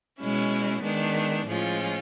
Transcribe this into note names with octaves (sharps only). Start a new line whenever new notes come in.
B2 G#3 C#4 E4
D#3 G#3 B3 D4
A2 F3 G#3 C#4 F4